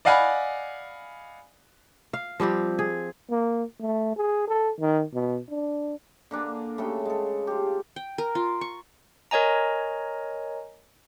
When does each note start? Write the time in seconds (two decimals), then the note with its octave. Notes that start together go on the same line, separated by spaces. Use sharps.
0.05 D5 D#5 F5 F#5 G#5 B5
2.13 F5
2.40 F3 G3 C4 G4
2.79 G#4
3.30 A#3
3.81 A3
4.17 G#4
4.48 A4
4.80 D#3
5.14 B2
5.50 D4
6.31 D3 A#3 D4 G#5
6.78 C#3 A3 A4 G5
7.05 G#3 A4
7.47 F4 G4
7.96 G5
8.18 A#4
8.35 F4
8.61 C#6
9.31 A#4 C#5 D#5 G#5 A#5